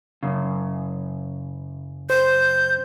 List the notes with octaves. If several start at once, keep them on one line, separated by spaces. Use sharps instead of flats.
F#2 C#3
C5 G6